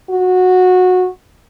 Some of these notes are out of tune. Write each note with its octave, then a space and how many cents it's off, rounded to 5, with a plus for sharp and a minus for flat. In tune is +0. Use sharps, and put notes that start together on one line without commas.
F#4 -15